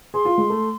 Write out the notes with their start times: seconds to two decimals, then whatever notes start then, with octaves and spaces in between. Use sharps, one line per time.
0.14 G#4 C6
0.25 F4
0.38 G#3
0.50 A3